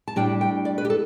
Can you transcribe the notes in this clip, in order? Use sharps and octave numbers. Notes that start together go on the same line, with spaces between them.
A5
A2 G3 D4 G5
G5
D5
B4
G4
A4